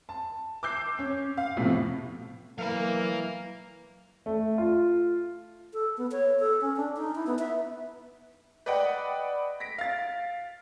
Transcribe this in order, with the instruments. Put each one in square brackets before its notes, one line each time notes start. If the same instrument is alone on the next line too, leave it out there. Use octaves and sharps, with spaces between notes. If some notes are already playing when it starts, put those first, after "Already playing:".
[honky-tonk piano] A5
D6 E6 G6 C7
C#4
F5
F2 A2 C3 B3
[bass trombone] E3 [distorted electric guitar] F#3 B5 [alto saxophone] A#3 [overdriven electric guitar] F5 A#5
[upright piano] A3
F4
[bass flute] A4
B3
C#5
A4
C#4
D4
D#4
E4
B3
E5
[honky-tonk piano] B4 D5 D#5 F#5 G5 B5
A#6 B6 D7
F5 A6